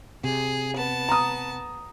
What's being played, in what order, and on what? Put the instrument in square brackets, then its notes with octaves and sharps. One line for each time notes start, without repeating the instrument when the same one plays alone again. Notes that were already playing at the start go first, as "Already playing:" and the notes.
[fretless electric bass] C3 [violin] G#4
[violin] B3 A5
[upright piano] A#5 D#6